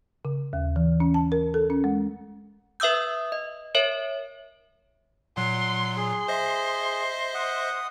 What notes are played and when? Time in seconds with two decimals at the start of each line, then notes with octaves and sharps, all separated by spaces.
0.25 C#3
0.53 D#2
0.76 E3
1.00 C#4
1.14 A5
1.32 A#4
1.54 A4
1.70 C#4
1.84 G#3
2.80 B4 E5 D#6 E6 G6
3.32 D#5
3.75 A#4 C#5 E5
5.37 A#2 F#3 F#5 C6
5.97 G#4 C6
6.28 C5 D#5 E5
7.34 F#5 D#6